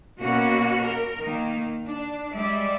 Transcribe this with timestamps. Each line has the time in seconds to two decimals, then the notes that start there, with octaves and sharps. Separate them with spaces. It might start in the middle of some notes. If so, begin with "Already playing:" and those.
0.19 B2 A#3 C#4 F#4
0.84 A#4
1.21 D#3 A#3
1.86 D4
2.32 G3 G#3 D5 E5